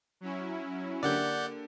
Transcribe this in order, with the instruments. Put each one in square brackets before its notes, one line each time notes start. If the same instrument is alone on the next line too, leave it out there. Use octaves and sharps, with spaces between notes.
[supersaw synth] F#3 C#4 E4
[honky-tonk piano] D3 A#3 G4 [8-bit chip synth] D5 F#5 G6